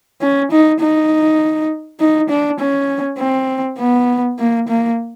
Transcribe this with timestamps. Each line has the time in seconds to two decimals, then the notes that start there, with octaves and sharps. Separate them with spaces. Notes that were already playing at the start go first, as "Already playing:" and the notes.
0.22 C#4
0.51 D#4
0.81 D#4
2.00 D#4
2.30 D4
2.60 C#4
3.19 C4
3.79 B3
4.39 A#3
4.68 A#3